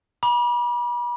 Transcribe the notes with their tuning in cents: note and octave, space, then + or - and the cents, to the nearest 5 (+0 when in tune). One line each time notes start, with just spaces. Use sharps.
B5 -40 D6 +0